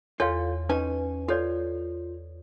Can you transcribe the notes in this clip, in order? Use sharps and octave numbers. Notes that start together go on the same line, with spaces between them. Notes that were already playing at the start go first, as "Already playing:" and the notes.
E2 F4 A4 C#5 F5 C6
C#4 D#4 B4 G#5
F4 A4 C#5 D5